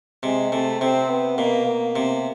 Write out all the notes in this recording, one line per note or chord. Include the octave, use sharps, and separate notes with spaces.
C3 G#3
C3 A3
C3 C4
B3
B2 A#3
A#3
C3